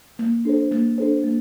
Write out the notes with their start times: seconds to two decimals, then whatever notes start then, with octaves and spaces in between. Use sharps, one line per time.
0.19 A#3
0.45 D4 A4 C5
0.72 A#3
0.98 D4 A4 C5
1.24 A#3